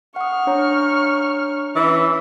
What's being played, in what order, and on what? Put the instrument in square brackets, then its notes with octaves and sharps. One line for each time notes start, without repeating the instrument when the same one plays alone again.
[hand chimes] F#5 D#6 [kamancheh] C#6 F6
[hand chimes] D4 C#5 A#5
[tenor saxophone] E3 [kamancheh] C#4 B4